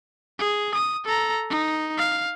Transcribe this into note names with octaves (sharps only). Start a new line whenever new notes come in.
G#4
D#6
A4 A#5
D#4
F5